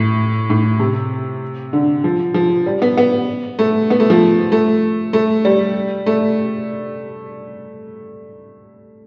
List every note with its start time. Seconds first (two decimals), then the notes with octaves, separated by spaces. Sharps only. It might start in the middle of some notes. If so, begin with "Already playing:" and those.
Already playing: A2
0.50 A2
0.80 C3
1.73 D3
2.04 F3
2.34 F3
2.66 G3
2.82 B3
2.97 B3
3.59 A3
3.90 B3
4.00 A3
4.10 F3
4.52 A3
5.13 A3
5.45 G3
6.06 A3